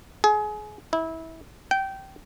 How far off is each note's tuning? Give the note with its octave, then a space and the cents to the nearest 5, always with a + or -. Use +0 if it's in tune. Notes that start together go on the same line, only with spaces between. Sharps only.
G#4 +25
E4 -25
G5 -20